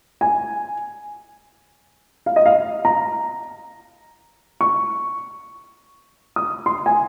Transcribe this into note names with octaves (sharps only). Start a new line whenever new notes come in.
G#5
F5
D#5
F5
A#5
C#6
D#6
C6
G#5